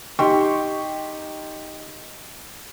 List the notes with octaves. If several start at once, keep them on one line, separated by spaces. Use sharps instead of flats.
D#4 G4 G5 C6 C#6